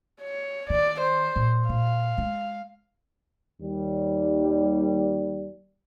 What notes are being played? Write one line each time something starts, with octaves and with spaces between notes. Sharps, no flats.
C#5
D#3 D5
C5
A#2
A#2 F5
G#3
D#2 G3